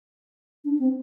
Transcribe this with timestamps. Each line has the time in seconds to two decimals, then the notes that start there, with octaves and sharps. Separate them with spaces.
0.65 D4
0.79 C4